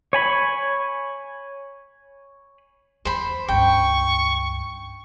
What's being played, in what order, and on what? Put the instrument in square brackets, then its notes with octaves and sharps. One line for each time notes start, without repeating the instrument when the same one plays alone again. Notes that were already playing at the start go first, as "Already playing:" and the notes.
[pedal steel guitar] C#5 G#5 B5
[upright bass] E2 [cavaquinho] C5 B5
[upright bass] C#2 G2 [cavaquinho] G5 [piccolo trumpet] C#6